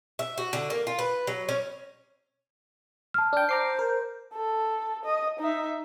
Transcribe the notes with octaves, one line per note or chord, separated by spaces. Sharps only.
E5
F#4
D3
A#3
F4
B4
F#3
C#4
A5 F6
D4 G5
C5 A#5 D6 C7
A#4
A4
D#5
D#4 E5